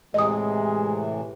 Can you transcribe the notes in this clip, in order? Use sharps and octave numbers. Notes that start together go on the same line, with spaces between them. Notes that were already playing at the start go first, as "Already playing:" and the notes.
A2 C3 E3 G#3 D#5 D#6